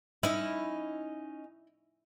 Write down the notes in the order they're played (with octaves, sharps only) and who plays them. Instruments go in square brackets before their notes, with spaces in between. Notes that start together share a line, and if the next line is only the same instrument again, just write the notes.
[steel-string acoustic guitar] C#4 D#4 D#5 [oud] E4